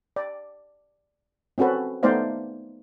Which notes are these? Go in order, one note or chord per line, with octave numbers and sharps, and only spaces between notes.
D5
C4 C#4 F#4 A4 B4
A3 B3 D#4 C5 D5 F5